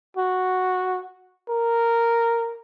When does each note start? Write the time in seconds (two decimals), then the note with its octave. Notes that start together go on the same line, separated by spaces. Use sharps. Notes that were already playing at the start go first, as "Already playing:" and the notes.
0.17 F#4
1.49 A#4